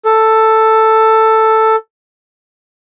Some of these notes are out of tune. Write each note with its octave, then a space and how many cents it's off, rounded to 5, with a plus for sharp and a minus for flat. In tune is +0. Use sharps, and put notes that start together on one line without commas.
A4 +5